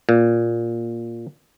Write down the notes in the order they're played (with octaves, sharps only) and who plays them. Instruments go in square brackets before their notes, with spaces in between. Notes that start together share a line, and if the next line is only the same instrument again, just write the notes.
[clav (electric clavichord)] A#2